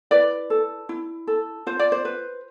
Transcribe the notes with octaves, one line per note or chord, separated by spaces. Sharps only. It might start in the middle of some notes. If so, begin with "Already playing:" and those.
E4 B4 D5
A4
E4
A4
F4 C5
D5
C5
B4